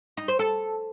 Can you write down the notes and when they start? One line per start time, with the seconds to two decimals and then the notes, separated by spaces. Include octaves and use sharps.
0.17 D#4
0.28 C5
0.39 A4